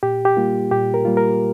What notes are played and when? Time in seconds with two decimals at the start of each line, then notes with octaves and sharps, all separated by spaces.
0.03 A#2 G4
0.25 G4
0.37 G3 A#3 F4
0.71 A#2 G4
0.94 A#4
1.05 G3 A#3 F4
1.17 A#4